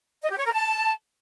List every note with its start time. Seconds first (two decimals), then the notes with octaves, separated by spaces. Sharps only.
0.22 D#5
0.30 G4
0.38 C#5
0.45 A#4
0.53 A5